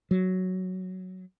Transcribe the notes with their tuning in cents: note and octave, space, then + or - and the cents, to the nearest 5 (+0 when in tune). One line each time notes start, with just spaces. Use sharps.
F#3 +5